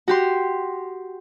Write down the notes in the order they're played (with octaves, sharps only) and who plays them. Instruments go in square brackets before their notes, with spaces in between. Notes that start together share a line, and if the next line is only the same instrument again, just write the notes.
[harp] F#4 G4 C6